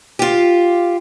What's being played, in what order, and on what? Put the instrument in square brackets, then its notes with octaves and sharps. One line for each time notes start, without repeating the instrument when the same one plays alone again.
[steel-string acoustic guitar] F4 G4